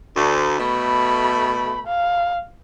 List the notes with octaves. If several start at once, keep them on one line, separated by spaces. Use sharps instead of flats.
D2
B2 A3 B5
F5